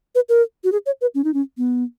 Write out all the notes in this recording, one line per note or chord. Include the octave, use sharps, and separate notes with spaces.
B4
A#4
F#4
G#4
C#5
B4
C#4
D#4
C#4
B3